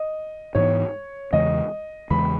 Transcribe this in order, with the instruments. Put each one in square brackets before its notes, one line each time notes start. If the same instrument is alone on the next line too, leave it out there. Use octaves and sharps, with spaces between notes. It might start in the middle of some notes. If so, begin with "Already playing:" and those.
Already playing: [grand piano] D#5
[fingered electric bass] G#2 E3 B3 [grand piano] C#5
[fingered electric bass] E2 C#3 E3 G#3 [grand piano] D#5
[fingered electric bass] E2 C#3 E3 G#3 [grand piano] B5